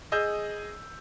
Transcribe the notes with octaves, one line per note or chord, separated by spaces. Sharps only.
G#4 D#5 E6 G6